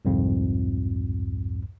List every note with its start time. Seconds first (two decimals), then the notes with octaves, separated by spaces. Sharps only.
0.05 C2 F2 G#2